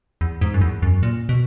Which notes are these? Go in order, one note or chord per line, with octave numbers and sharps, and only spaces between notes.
E2
G#2
F#2
E2
F#2
A#2
B2